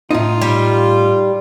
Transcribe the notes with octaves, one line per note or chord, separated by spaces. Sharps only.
A2 D#4 F4
G3